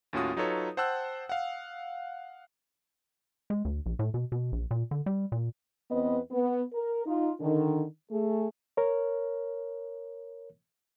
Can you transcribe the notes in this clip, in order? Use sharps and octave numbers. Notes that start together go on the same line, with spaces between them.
D#2 A2 C#4 F4 F#4 D#6
F#3 D#4 F4 A4 B4 C#5
C5 F#5 G5 A5 E6 F#6
F5 F#5
G#3
D2
A#1
A2
B2
B2
A#1
A#2
D3
G3
A#2
E2 B3 C4 B4 D#5
B3
A#4
D#4 F4
D3 D#3
A3 G#4
A#4 C#5